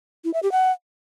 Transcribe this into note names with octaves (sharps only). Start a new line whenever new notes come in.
E4
E5
G4
F#5